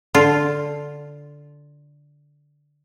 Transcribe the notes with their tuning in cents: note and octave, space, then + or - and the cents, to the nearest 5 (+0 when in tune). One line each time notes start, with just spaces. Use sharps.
D3 -5 F4 +0